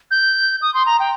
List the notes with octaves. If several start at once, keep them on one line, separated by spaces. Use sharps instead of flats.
G6
D#6
C6
A#5
G5